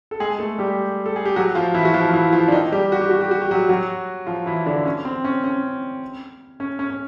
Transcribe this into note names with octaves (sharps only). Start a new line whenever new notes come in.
A4
G#3 G#4
A3 A4
G3 G4
A4
G#4
G4
F#3 F#4
F3 F4
E3 E4
F#4
F3 F4
F4
E3 E4
F3 F4
D4
D#3 D#4
G3 G4
F#4
G4
F#4
G4
F#4
G4
F#3 F#4
F#3 F#4
F3 F4
E3 E4
D3 D4
C#4
C4
C#4
C#4
C#4
C#4
C#4